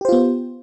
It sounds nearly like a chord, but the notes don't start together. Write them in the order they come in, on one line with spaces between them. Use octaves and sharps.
G4 C5 F4 B3